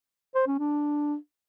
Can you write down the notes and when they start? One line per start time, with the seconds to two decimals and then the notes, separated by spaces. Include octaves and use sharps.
0.35 C5
0.47 C#4
0.59 D4